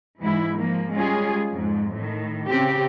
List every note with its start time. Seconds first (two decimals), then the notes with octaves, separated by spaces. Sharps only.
0.20 G#2 E3 E4
0.60 F3 A#3
0.95 G3 G#3 C#4 F4 G#4
1.49 F2 G#2
1.95 A2 D#3
2.46 C#3 C4 G4